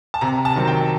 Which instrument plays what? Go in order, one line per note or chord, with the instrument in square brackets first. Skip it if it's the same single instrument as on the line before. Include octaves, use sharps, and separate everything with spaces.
[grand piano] A5
C3 A#5
A5
D#3 F#3 C4
G5